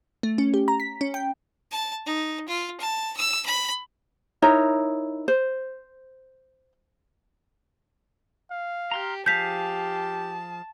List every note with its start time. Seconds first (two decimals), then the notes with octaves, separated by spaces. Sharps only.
0.23 A3
0.38 C#4
0.54 G4
0.68 A#5
0.80 B6
1.01 C#4
1.14 G5
1.71 A5
2.06 D#4
2.48 F4
2.80 A5
3.17 E6
3.46 B5
4.42 D#4 E4 A#4 C#5
5.28 C5
8.52 F5
8.91 G4 A#5 C6 F6
9.26 F3 G4 G#4 F5 A5 G6 B6